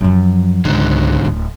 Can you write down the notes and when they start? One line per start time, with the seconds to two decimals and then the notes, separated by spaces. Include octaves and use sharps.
0.01 F#2 F3
0.65 C#2 G#2 D3
1.25 D1